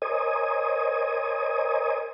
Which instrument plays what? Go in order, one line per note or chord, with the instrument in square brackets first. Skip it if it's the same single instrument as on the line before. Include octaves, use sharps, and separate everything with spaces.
[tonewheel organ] A#4 C5 C#5 D#5 G#5 D#6